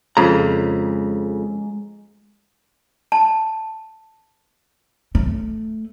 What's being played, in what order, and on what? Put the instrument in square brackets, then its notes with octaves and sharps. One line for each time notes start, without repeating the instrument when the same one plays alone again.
[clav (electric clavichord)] F2 C#3 [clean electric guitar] G#3 A#5
[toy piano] A5
[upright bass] A3